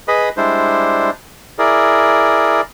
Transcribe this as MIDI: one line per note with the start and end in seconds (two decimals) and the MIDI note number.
0.08 0.29 68
0.08 0.29 71
0.08 0.29 75
0.08 0.29 83
0.37 1.10 55
0.37 1.10 56
0.37 1.10 62
0.37 1.10 64
0.37 1.10 72
1.59 2.61 64
1.59 2.61 68
1.59 2.61 70
1.59 2.61 74